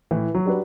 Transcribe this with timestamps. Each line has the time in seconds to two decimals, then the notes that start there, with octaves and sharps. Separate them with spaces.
0.11 A2 E3
0.35 F#3
0.46 G3 D4 F#4 B4